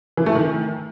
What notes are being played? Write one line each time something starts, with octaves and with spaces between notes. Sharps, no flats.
E3
A3
D#3